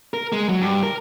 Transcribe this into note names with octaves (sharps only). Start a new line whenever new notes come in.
A#4
G#3
F#3
G2
A#4